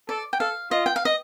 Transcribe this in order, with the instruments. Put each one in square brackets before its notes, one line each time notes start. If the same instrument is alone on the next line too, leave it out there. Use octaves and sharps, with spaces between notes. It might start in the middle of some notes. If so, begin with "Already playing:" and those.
[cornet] A4 [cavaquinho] D5
[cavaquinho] G5
[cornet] A4 [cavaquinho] F5
[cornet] F4 [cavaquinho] D#5
[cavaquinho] G5
F5
D#5